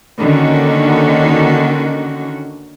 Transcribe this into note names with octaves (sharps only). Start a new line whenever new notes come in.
D3 D#3 A#3 C#4 F#4